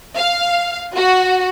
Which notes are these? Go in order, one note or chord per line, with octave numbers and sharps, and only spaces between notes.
F5
F#4